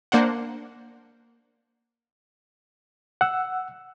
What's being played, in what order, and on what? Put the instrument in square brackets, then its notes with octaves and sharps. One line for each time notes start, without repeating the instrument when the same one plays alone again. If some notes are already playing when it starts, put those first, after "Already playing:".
[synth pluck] A#3 D4 C5 F#5
[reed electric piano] F#5 E6